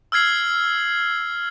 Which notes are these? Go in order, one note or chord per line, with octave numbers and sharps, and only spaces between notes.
E6 F6 G#6 C7 F#7